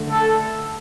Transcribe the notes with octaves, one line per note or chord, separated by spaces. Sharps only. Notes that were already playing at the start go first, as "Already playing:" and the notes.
Already playing: D3 A3
A4